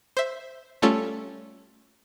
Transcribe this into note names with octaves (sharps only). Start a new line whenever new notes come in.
C5 E5
G3 A3 C#4 F4 A4